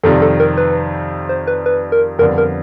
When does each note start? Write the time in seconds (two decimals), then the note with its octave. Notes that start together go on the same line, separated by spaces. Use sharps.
0.04 F2 C3 D#3 G3 A4
0.22 A4
0.40 A#4
0.57 B4
1.29 C5
1.47 B4
1.66 B4
1.92 A#4
2.19 F2 D3 G3 B3 D4 A#4
2.38 A#4